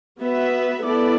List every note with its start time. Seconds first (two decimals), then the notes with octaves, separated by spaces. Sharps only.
0.19 B3 F#4 B4 E5
0.83 B3 E4 A4 D5